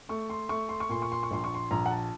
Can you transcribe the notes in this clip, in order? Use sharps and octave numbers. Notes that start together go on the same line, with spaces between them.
A3 C#6
C6
A3 C#6
C6
C#6
A#2 C6
C#6
C6
C#6
A#1 C6
C#6
C6
A#1 A#5
F#5
A5